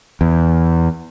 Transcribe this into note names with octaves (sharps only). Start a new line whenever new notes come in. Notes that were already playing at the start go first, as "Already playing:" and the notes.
E2